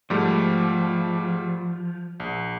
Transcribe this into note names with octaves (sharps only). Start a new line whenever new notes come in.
G#2 F3 G3 A3
A#1